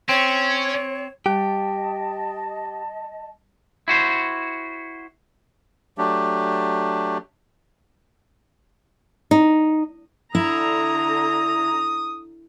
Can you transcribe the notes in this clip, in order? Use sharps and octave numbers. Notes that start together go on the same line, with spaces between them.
C4 C#4 C#5
G3 G4 D#5 A5
E4 F#4 C5
F#3 A3 D4 G4
D#4
D3 E4 A#5 D#6